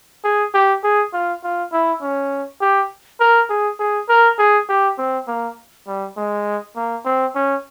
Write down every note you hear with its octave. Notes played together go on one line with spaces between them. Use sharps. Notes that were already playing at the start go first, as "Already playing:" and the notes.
G#4
G4
G#4
F4
F4
E4
C#4
G4
A#4
G#4
G#4
A#4
G#4
G4
C4
A#3
G3
G#3
A#3
C4
C#4